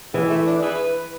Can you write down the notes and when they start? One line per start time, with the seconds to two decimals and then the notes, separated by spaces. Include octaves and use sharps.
0.14 E3 G#3
0.30 A3
0.47 D4
0.62 E4 G#4 B4